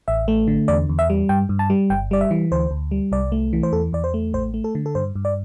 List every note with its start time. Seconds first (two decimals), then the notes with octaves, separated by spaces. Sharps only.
0.08 A1 E5
0.28 A3
0.48 D3
0.68 E2 D5
0.89 E2
0.99 E5
1.10 G3
1.29 G2 G5
1.49 G2
1.59 A5
1.70 G3
1.90 G1 G5
2.11 G3 D5
2.21 E5
2.31 E3
2.52 D2 C5
2.71 D2
2.91 G3
3.12 C2 D5
3.32 A3
3.53 E3
3.63 C5
3.72 E2 A4
3.93 E2 D5
4.04 C5
4.14 A3
4.33 A1 C5
4.54 A3
4.64 A4
4.75 D3
4.86 A4
4.95 G2 C5
5.16 G2
5.25 D5